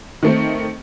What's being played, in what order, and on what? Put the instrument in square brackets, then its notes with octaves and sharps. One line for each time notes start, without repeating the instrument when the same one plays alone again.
[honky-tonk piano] D#3 A3 C4